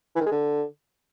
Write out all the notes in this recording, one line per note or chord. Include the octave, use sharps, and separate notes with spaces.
E3
D#3
G#3
D3